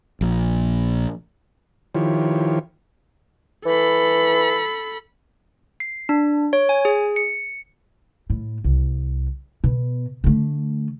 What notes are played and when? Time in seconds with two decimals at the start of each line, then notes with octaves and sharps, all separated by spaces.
0.21 A#1 A#2
1.95 D#3 F3 E4 F4 G4 C#5
3.66 E3 A4 B5
5.80 C7
6.09 D4
6.53 C#5
6.69 G#5
6.85 G#4
7.16 C#7
8.30 A2
8.64 C2
9.64 B2
10.24 D3 A3